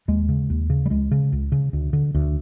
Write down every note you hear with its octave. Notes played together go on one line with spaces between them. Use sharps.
D#2 G#3
C#3
D#2
C#3
G3
C#2 G#3
C#3
C#2
C#3
D2
D3
D2